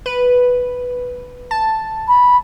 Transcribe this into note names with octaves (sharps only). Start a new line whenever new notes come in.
B4
A5
B5